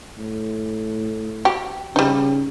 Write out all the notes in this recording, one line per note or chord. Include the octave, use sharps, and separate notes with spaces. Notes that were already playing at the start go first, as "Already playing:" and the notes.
A2
F#4 G4
C#3 G3 D#4